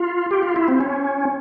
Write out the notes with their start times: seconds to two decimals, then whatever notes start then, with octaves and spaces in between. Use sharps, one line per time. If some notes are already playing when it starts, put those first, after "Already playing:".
Already playing: F4
0.31 G4
0.43 F4
0.56 E4
0.68 C4
0.80 C#4